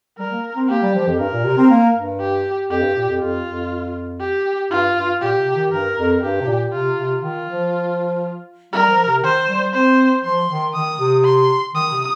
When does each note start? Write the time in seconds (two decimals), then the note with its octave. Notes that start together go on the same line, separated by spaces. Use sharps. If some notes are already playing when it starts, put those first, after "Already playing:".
0.19 G3 A#4
0.32 A#3
0.56 C4
0.69 A#3 G4
0.82 G3
0.95 F3
1.07 F2
1.19 G2 A#4
1.33 A#2
1.44 C3
1.57 C4
1.70 A#3
1.95 G2
2.20 G4
2.70 F2 G4
2.82 G2
2.96 A#2
3.08 F2
3.20 F2 F4
3.45 F2
4.20 G4
4.71 G2 F4
4.96 G2
5.21 A#2 G4
5.39 C3
5.55 D#3
5.71 G2 A#4
5.97 F2
6.21 G2 G4
6.41 C3
6.47 A#2
6.73 C3 F4
6.98 C3
7.22 D#3 F4
7.47 F3
8.73 G3 A#4
8.90 F3
9.07 C3
9.23 D#3 C5
9.48 G3
9.74 C4 C5
10.23 F3 C6
10.49 D#3
10.73 D#3 D#6
10.99 C3
11.24 C6
11.74 D#3 D#6
11.91 C3